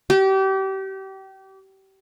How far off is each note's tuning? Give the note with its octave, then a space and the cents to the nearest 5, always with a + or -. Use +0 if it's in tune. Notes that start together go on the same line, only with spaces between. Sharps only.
G4 -30